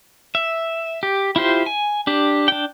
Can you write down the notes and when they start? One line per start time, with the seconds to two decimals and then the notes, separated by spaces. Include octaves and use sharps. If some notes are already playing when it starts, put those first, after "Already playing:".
0.35 E5
1.03 G4
1.36 E4 F4 G4 C5
1.66 G#5
2.07 D4 G4
2.48 D4 G5